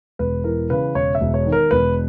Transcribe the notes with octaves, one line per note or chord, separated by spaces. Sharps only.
E1 B4
E3 A#4
C#3 B4
E1 C#5
E5
E1
C#5
D#3
A#4
E1 B4